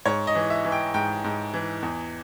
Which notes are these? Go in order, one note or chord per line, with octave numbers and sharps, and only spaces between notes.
G#2 C#5
D#5
E3
E5
E3
G5
G#2 G5
G#2
E3
E2